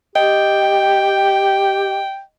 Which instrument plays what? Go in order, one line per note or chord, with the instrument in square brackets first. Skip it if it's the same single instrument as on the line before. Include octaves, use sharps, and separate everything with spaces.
[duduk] G4 [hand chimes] D#5 [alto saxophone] G5